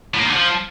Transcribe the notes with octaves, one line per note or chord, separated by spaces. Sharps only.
A2
A#3
D#3
D3
F3